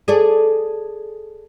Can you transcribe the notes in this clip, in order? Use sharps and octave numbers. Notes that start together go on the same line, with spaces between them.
G#4 A4 D5